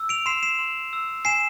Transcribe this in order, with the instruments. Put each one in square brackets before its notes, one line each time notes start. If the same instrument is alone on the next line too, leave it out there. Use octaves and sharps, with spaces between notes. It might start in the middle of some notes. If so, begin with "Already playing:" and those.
Already playing: [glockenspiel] E6
D7 F7
C6 C7 E7
C7 E7
C6
E6
G#5 C7 E7